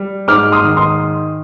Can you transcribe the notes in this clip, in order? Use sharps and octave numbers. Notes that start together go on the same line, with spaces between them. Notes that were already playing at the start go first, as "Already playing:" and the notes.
Already playing: G3
G#2 D6 F6
C6 D#6
D#3
C6 D#6